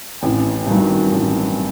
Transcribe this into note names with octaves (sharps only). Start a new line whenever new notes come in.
A1 C4
G2 D#3 F#3
A1